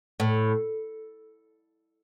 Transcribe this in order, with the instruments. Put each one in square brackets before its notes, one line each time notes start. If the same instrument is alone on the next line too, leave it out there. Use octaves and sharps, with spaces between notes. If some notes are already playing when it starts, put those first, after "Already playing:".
[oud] A2